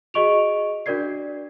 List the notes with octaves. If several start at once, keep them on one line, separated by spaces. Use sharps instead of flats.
F#4 G#4 D#5 C#6 D7 F7
D4 F#4 A#4 D5 G#6 C7